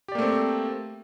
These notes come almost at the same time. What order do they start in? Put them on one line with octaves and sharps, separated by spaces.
G4 D5 A#3 A3 C4